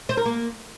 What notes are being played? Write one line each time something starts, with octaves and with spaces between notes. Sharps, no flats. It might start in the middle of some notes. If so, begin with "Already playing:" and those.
C5
A#4
A#3